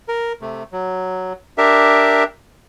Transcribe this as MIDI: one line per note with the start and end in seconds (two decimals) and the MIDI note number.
0.08 0.33 70
0.41 0.63 48
0.41 0.63 57
0.72 1.33 54
1.58 2.24 62
1.58 2.24 67
1.58 2.24 70
1.58 2.24 76